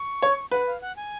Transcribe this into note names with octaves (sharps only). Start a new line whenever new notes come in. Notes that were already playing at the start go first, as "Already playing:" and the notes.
Already playing: C#6
C#5
B4 F#5
F5
F#5
G#5